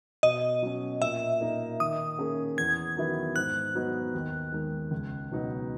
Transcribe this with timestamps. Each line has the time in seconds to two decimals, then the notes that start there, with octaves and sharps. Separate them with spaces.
0.23 B2 D#5
0.62 F#3 C#4
1.02 A#2 E5
1.41 A#3 D#4 A#4
1.80 D#3 D#6
2.18 A#3 C#4 G#4
2.57 E2 G#6
2.96 D#3 F#3 B3 E4
3.36 G#2 F#6
3.75 F#3 B3 D#4
4.14 D#2
4.52 D#3 G#3
4.91 C#2
5.31 B2 F#3 B3 D#4